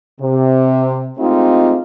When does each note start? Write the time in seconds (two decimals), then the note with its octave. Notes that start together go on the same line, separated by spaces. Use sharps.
0.20 C3
1.18 G#3 A3 C4 D#4 F4 G4